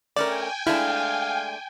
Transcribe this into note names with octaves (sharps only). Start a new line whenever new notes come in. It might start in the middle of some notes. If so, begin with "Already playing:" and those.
A3 C#4 A#4 D5 G5 G#5
G#3 A3 D4 E4 F5